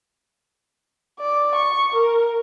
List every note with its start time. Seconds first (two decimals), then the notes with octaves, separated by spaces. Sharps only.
1.20 D5
1.56 C#6
1.93 A#4